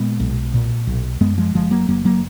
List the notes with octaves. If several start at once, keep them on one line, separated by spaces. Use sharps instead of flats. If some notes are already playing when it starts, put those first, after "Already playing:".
Already playing: A#2 G#3 B3
B1
A#2
B1
F#2 G#3 B3
F3 G#3
F#1 F3 G#3
F#3 A#3
F#1 F#3 A#3
F#3 A#3